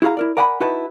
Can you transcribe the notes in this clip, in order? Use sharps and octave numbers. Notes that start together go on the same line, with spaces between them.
E4 F#4 G#4 F5 A#5
E4 A#4 D5
A#4 D5 F#5 G#5 A5 B5
D#4 E4 F#4 B4 D#5 A5